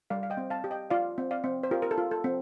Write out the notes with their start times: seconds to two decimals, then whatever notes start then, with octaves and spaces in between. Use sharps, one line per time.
0.10 G3 D5 F5
0.23 F5
0.30 D#5 G5
0.37 C4
0.50 F5 A5
0.64 G4
0.71 D#5 G5
0.90 F4 D5 F5
1.18 C4
1.31 D5 F5
1.44 C4
1.63 C5
1.71 F4 G4 A#4
1.82 A#4
1.91 A4
1.98 F4
2.11 A4
2.24 C4